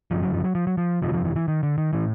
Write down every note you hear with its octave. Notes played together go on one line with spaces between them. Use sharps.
G1 F#2 C#3 F3
F#3
F3
F#3
F3
F#3
F3
G1 F2 C3 F3
F#3
F3
E3
E3
D#3
D3
D#3
A2 E3